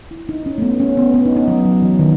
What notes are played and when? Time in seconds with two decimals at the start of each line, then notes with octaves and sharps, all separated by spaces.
0.11 E4
0.29 D#4
0.46 C#4
0.58 A3
0.62 B3
0.80 C#4
0.97 B3
1.14 B3
1.25 D#4
1.37 D#4
1.48 F#3
1.65 F#3
1.82 E3
1.99 D#3